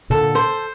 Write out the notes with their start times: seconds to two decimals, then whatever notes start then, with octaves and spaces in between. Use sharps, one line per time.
0.10 A#2 D3 A4
0.35 C5